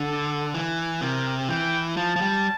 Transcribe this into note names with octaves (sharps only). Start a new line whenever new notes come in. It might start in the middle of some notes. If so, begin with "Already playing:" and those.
Already playing: D3 A4
E3
C3 A#4
E3 G5
F3 A5
F3
G3